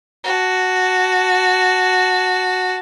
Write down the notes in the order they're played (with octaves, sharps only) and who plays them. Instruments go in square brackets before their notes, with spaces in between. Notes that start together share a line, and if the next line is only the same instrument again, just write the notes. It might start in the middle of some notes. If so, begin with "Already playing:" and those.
[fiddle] F#4 A5